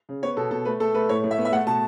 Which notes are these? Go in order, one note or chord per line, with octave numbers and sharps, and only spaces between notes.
C#3
B3 C#5
B2 A4
B2 A4
A3 B4
A3 A4
A3 B4
A2 C#5
A2
E5
B3
E5
A3 F#5
B2 A5